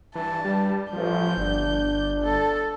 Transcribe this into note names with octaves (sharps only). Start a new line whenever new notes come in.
G2 E3 A5
G3
A1 F3 G6
G1 D4
A4